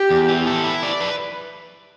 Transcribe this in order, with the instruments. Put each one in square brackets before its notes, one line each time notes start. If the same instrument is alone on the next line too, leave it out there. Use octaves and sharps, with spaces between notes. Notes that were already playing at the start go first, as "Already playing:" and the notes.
Already playing: [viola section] G4
[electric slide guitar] E2
E3
A4
E4
D5
B4